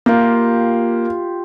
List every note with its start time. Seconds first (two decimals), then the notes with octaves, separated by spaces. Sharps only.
0.06 A#3 F4 G4